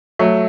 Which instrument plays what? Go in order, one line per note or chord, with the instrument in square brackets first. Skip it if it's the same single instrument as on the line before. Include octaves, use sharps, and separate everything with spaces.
[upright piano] F#3 A3